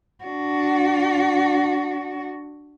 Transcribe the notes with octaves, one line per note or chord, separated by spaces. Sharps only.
D4 F#4